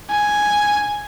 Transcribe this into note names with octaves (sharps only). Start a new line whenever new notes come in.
G#5